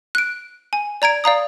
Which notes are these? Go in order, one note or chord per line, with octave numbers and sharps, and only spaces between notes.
F#6 D7
G#5
D5 A#5 G#6 D7
D5 F5 A#5 D#6